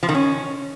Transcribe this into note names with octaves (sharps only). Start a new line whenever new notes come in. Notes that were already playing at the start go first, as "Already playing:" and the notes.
F3
D#3
C#4